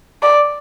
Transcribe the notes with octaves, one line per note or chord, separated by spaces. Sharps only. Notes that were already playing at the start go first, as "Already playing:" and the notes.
D5